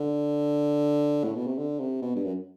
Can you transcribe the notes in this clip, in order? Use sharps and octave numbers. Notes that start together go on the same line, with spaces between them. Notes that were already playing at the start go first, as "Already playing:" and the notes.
Already playing: D3
A2
B2
C3
D3
C3
B2
G2
F#2